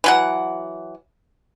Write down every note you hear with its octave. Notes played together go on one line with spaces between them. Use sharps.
E3 F#3 F#5